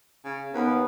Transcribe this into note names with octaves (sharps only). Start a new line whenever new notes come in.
C#3
D#2 B3